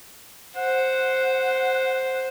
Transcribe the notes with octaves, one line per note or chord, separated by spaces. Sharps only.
C5 F#5